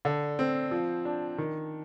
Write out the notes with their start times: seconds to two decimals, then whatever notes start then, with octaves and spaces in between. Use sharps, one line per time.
0.05 D3
0.39 C4
0.71 F3
1.05 D4
1.38 D#3